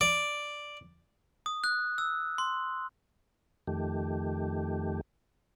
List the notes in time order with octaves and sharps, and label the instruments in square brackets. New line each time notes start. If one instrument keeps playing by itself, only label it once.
[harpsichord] D5
[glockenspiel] D#6
F#6
E6
C6
[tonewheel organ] F2 D#3 A3 G4